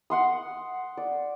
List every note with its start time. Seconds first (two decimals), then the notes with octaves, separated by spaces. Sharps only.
0.10 F#5 C6 D#6
0.97 D5